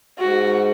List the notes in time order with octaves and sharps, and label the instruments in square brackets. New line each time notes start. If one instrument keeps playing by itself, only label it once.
[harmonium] G#2 [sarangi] F#4